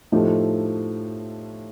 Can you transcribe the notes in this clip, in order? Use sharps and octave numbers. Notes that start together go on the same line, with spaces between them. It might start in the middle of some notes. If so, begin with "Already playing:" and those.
A2 F3 A3 D#4 G4